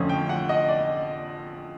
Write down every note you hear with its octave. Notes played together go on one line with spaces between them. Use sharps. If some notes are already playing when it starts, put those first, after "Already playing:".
Already playing: F2 D3 F3 A3 C#4
G5
F#5
D#5
D5